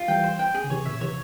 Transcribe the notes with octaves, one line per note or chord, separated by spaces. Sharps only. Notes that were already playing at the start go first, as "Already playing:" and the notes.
Already playing: F4
E3 G3 G5
C5
G5
G#4
C#3
C3 E3 C#5
A#2 C#3 E5
C3 E3 C#5